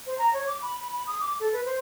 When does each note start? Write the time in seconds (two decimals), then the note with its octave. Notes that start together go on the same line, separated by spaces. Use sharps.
0.07 C5
0.18 A#5
0.34 C#5
0.47 D6
0.62 B5
0.79 B5
0.93 B5
1.07 D#6
1.21 D6
1.40 A4
1.53 B4
1.66 C5